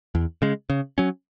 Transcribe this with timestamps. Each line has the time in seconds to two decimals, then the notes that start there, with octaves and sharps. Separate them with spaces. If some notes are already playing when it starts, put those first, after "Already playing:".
0.15 E2
0.42 C#3 G#3
0.70 C#3
0.98 F#3 C#4